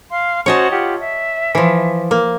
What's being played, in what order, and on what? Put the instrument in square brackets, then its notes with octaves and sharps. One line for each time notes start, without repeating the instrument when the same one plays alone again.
[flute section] F5 C6
[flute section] C#4 F#4 C5 [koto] C#5 D#5 A5
[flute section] F4 G4 F#5
E5
[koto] E3 F3
A#3